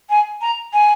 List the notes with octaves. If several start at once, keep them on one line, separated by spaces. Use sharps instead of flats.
G#5
A#5
G#5